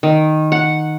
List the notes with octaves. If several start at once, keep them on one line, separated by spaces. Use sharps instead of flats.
D#3
F#5